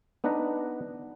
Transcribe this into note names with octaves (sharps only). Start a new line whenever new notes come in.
B3 D4 D#4 B4 F#5 A#5